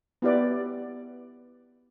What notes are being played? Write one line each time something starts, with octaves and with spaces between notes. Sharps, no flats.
B3 E4 G4 B4 D5